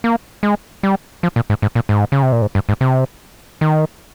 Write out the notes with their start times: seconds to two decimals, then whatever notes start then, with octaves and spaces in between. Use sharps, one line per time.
0.04 A#3
0.43 G#3
0.83 G3
1.23 F3
1.36 A#2
1.50 G#2
1.62 G#2
1.75 A#2
1.89 G#2
2.12 C#3
2.22 C3
2.32 A#2
2.42 G#2
2.55 G2
2.69 G#2
2.81 C3
3.61 D#3